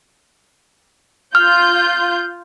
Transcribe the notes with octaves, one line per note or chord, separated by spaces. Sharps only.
F4 F6 G6